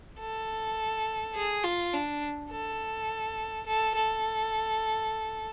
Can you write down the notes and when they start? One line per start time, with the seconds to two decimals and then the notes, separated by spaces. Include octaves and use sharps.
0.19 A4
1.35 G#4
1.64 F4
1.93 D4
2.51 A4
3.67 A4
3.95 A4